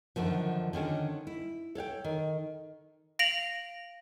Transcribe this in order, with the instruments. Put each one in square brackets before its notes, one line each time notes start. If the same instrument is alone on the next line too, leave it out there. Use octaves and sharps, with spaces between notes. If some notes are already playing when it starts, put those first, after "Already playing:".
[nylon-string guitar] F#2 D3 D#3 F3
D3 D#3 C#4 A4
E4
A4 C#5 F5 G5
D#3
[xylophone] F5 A#6 D7 F7 F#7